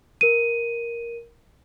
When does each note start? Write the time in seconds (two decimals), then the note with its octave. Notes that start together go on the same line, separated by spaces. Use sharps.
0.21 A#4 D#7